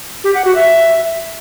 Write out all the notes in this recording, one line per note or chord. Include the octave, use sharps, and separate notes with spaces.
G4
F#5
F#4
E5